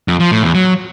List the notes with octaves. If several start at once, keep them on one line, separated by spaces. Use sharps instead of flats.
F2
F3
A2
E2
F#3